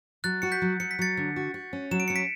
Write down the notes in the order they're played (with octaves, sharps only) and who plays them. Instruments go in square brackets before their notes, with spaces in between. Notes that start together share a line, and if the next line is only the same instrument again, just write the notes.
[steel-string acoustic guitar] F#3 [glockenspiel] F#6 A6
[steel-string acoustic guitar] F#4 [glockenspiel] C#7
[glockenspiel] G6 B6
[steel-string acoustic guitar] F#3
[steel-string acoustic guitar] F#3 [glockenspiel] C#7
[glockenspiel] B6
[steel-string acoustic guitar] F#3 [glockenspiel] A6 C#7
[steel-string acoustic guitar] D3
F#4
F#4
C#4
[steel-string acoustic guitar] F#3 [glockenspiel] E7
[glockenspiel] D7
[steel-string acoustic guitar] C#4 [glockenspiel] C#7
[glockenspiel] B6 D7